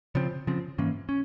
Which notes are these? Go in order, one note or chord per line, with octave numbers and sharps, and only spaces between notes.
C#3 F3 C4
C#3 F3 C4
G#2 E3 A#3 C#4
C#4